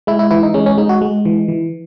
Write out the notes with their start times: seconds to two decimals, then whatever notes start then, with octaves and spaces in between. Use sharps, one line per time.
0.07 G#3 E4
0.19 E4
0.31 E3 E4
0.43 D#4
0.54 G#3 C#4
0.66 C#4
0.78 G#3 D#4
0.89 F#4
1.01 G#3
1.25 E3
1.48 E3